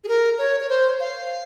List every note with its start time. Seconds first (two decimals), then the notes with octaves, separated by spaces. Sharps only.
0.04 G#4
0.08 A#4
0.38 C#5
0.60 C#5
0.69 C5
1.00 F5